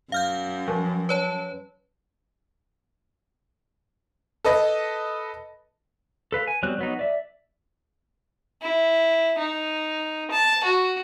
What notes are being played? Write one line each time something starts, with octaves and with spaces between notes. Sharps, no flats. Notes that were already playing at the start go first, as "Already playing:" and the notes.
F#2 F5 F6 G6
F3 F#3
B4 C#5 A5
A4 B4 D#5
A4 B4 F5
G#5
F#3 G3 B3 C4 F#6
F#3 B3 D#4
D5 E5
E4
D#4
A5
F#4